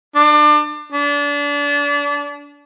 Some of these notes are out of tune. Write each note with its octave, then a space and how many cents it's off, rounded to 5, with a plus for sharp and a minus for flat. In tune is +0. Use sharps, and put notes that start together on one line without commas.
D4 +30
D4 -30